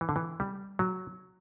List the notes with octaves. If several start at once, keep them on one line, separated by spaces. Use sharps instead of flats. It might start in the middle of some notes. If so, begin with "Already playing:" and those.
E3
D3
E3
G3
F#3